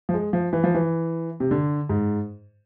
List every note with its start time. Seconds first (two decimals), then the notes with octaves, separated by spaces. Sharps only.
0.09 F3
0.14 G#3
0.33 F3
0.53 E3
0.64 F3
0.75 E3
1.40 C3
1.51 D3
1.89 G#2